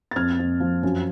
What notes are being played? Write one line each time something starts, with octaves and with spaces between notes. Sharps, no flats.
A6
F2 F6 G#6
F2
F3
F#2